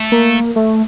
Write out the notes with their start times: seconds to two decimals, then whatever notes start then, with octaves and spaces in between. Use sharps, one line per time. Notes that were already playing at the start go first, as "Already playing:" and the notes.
Already playing: A3
0.12 A#3
0.56 A3